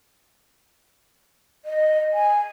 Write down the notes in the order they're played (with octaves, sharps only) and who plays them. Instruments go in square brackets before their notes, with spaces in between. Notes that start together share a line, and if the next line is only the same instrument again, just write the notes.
[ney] D#5
G#5